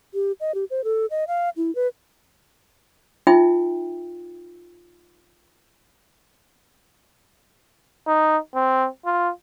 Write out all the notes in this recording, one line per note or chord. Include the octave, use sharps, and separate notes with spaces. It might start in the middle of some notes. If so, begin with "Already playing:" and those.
G4
D#5
G4
C5
A4
D#5
F5
E4
B4
D#4 F4 E5 G5
D#4
C4
F4